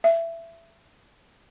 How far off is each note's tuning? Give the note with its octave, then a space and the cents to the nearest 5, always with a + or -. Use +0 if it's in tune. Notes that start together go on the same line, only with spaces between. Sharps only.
E5 +15